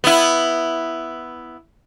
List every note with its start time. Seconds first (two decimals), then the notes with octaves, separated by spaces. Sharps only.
0.04 B3 E4